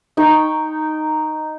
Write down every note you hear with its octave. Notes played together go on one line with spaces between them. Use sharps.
D#4 G5 C#6